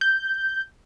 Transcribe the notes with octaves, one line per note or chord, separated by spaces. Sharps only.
G6